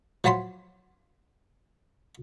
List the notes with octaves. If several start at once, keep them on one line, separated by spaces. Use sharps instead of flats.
F3 F#3 A5 B5 C6